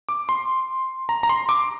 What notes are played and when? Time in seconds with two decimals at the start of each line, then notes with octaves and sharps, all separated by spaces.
0.09 D6
0.29 C6
1.09 A#5
1.23 A#5
1.29 C6
1.49 D6